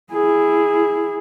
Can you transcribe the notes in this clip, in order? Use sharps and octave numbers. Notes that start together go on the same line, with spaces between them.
E4 G#4